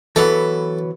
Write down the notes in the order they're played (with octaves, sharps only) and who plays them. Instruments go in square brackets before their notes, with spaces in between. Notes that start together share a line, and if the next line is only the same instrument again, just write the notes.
[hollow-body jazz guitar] E3 F#3 B3 [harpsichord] A4